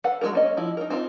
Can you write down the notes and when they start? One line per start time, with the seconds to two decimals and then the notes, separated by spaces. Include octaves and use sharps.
0.04 A4 B4 F5 F#5
0.21 F#3 G#3 D#4 F#4 A#4
0.33 A#3 C#4 D#5
0.57 F3 E4
0.77 D#4 A#4
0.90 C4 D#4 F4